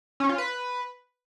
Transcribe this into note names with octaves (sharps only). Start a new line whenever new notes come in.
C#4
F4
B4